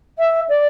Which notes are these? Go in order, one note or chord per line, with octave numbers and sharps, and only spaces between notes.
E5
D5